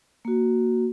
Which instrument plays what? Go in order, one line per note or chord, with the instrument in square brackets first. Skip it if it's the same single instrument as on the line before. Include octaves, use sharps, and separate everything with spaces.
[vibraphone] A#3 F#4